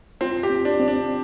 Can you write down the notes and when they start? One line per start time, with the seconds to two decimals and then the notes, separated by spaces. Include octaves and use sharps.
0.21 C4 F4
0.43 G4
0.50 C4
0.65 D4
0.80 C4
0.88 D4